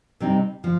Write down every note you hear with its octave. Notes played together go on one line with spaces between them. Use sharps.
C3 G3 C4 D#4
F3